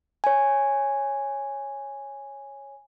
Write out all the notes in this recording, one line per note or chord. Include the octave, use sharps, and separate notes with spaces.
C#5 G#5